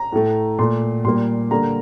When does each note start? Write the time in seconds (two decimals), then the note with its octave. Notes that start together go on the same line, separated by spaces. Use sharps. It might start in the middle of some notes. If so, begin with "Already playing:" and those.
Already playing: A#5
0.12 A2 A3
0.59 A#2 A3 C6
1.04 A#2 G3 A#3 C6
1.51 D3 G3 A#3 A#5